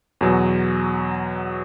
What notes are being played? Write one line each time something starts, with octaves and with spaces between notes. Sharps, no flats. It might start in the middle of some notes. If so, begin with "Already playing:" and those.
E2 B2 F#3